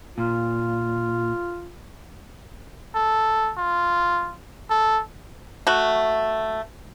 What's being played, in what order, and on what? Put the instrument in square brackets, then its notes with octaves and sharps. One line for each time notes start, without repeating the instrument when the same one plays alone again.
[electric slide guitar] A#2 [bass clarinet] F4
[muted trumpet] A4
F4
A4
[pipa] A3 F#4